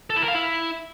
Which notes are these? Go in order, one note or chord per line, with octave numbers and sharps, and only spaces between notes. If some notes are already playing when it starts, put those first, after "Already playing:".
A4
E4
A#4
F5
E4